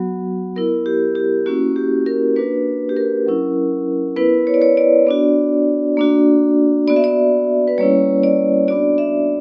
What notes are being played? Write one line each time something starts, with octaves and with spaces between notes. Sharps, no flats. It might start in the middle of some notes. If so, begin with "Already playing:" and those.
Already playing: F#3 B3 F#4
B3 E4 A#4
G4
G4
A#3 C#4 E4 F#4
G4
A#4
A#3 D4 F#4 B4
G4
A#4
F#3 C#4 E4
B3 E4 B4
C#5
D5
C#5
D5
B3 D4 F#4
A#3 D4 F#4
B3 F#4 D5
E5
D5
B4
G3 A#3 C#4 E4 C#5
D5
B3 D4 F#4 D5
E5